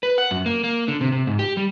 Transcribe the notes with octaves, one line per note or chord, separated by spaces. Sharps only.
B4
F#5
F#2
A#3
A#3
D3
C3
C3
G#2
G4
G3